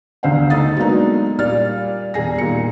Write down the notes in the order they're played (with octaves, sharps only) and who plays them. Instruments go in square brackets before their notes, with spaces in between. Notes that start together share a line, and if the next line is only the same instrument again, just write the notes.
[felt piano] G1 D2 C#3 C5 F5 F#5
A3 D#4 D#6 A6
F#3 G#3 A#3 B3 D4 D#4
A#2 G3 D5 F6 A6
E1 G3 G#4 A#6
A#2 D#3 C#7